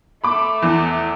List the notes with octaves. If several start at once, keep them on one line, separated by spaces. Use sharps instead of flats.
A3 E5 B5 D6
E2 E3